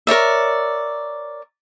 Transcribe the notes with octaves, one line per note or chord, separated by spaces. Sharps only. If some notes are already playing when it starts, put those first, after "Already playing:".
A#4 C#5 D5 E5